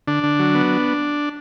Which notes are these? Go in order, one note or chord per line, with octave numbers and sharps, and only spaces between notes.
D3 D4
D3
F#3
B3